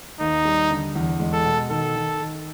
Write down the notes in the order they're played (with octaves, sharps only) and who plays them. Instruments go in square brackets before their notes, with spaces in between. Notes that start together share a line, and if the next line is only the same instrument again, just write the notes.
[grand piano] D#2 [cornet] D#4
[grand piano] G3
D3
E2
G#3
[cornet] A4
[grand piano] B2
[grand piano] D#3 [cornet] A4
[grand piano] D#3
D#3